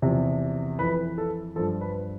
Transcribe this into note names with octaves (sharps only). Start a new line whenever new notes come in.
E2 C3 F3
F2 E3 B4
A4
G2 F3 A4
B4